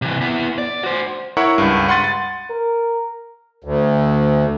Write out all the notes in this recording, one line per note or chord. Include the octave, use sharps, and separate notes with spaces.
C3 E3
B3 E4
D5
F#4 C5
E4 A#4 C#5 E5 F#5 C#6
C#2 G2
F#5 B5 C6 A6 D#7
A6
A#4
D2